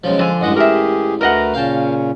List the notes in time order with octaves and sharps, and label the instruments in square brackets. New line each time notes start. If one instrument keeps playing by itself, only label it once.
[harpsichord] B1 C#3 F3 [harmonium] G#3
[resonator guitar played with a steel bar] D3 G#5 [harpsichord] F3
[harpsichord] A1 E3 G#3 [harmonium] G2 D#5 F#5
[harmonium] G4 G#4 [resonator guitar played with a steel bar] A#4 E5
[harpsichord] D2 [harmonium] A3 B4 A#5 [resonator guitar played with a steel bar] A#4 D#5 F#5
[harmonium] A#2 C#3 C#4 [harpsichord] F5 G5 A5